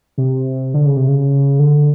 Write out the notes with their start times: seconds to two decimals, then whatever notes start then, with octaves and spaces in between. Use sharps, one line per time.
0.18 C3
0.74 D3
0.85 C#3
0.97 C3
1.08 C#3
1.59 D3